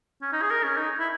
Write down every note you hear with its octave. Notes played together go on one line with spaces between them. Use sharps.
C#4
D#4
G#4
A#4
C#4
D#4
E4